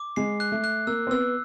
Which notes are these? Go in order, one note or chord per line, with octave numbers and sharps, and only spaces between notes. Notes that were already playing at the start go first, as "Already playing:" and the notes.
Already playing: D6
G#3 C7
F#6
A3
F#6
A#3 E6
C4
B3 E6